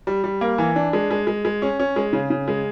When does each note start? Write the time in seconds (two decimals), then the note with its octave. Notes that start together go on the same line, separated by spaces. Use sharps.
0.07 G3
0.24 G3
0.41 A#3
0.58 E3
0.76 D4
0.93 G#3
1.11 G#3
1.27 G#3
1.45 G#3
1.62 C#4
1.79 C#4
1.96 G#3
2.13 C#3
2.30 C#3
2.48 G#3